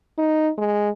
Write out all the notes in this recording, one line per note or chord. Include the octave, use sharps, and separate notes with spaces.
D#4
G#3